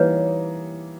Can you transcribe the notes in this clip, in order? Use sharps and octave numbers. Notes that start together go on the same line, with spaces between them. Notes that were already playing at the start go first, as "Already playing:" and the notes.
Already playing: E3 G3 A#3 D#4 B4 C#5